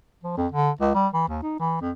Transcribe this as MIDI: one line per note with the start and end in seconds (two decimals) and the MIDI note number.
0.23 0.34 53
0.37 0.47 41
0.51 0.70 50
0.80 0.91 37
0.95 1.08 55
1.13 1.24 52
1.28 1.40 39
1.42 1.57 63
1.59 1.80 52
1.81 1.91 41